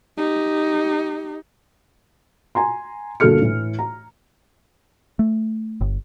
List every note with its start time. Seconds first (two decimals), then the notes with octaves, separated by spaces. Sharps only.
0.17 D#4 G4
2.55 G#5 A#5 C6
3.20 G1 A#3 F#4 A4 F6 C#7
3.42 A2 E3
3.79 A#5
5.19 A3
5.81 G1